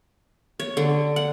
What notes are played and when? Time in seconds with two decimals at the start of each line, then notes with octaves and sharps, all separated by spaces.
0.60 C#5
0.77 D3
1.16 F#5